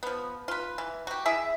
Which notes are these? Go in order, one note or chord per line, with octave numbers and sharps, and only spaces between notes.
F3 B3
F4 B4
E3
F#4 G4
E4 G#4 E5